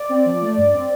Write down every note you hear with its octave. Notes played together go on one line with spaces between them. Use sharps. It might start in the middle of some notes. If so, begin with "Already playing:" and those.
Already playing: D5
C4
F3
A3
G2
C4